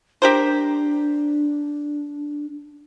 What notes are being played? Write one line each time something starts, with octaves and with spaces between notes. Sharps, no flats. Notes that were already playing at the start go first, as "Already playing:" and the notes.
D4 G4 A#4 C5